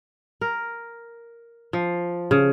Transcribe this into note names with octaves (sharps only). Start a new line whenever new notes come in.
A#4
F3
C#3